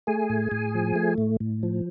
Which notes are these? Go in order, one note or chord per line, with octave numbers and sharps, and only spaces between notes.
A3 G#4 G#5
A2
A2
F3
A3
A2
A2
F3